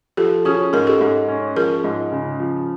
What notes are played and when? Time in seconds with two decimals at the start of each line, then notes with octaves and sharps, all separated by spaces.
0.17 F3 G4 A4
0.45 C#4 F#4 G#4
0.73 G#2 G#4 A#4
0.87 G4 A4
1.01 G#2
1.28 C#4
1.56 F3 G#4 A#4
1.84 G#2
2.12 C#3
2.40 F3